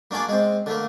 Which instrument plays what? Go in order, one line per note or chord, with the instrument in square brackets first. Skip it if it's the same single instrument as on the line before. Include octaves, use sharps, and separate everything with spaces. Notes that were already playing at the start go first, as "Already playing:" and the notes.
[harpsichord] A#3 D4 F#4 G#4 D5
G#3 C4
D3 A3 A#3